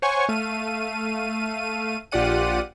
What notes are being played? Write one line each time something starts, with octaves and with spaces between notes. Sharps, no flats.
C5 C#5 F#5 G#5 C#6
A3 F5 D#7
A#1 F4 G4 D5 F#5 D#7